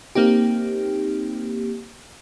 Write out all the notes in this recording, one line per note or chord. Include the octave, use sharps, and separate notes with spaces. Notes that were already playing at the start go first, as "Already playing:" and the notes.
A#3 C4 D#4 G4